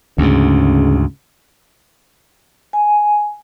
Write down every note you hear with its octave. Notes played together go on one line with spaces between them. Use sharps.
D2 G#2 C#3
G#5